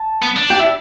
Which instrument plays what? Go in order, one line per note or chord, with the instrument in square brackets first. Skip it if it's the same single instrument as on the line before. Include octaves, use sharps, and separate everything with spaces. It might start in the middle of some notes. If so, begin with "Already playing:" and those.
Already playing: [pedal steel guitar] A5
[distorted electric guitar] B3
D4
[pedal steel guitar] G4 G5
E4 E5